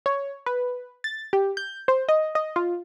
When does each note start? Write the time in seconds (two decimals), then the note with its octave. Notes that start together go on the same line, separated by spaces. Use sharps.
0.06 C#5
0.46 B4
1.04 A6
1.33 G4
1.57 G6
1.88 C5
2.09 D#5
2.35 D#5
2.56 F4